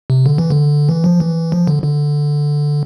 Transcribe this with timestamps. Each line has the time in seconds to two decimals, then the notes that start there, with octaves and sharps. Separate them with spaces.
0.10 C3
0.26 D3
0.38 E3
0.50 D3
0.89 E3
1.04 F3
1.20 E3
1.52 F3
1.67 D3
1.84 D3